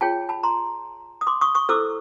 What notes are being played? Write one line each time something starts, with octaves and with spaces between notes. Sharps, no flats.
F4 G#4 C#5 G5 A5
A5 B5
A#5 C6
D#6
C6 D6
C#6 D#6
C#6 D#6
E4 A4 C5 D6 E6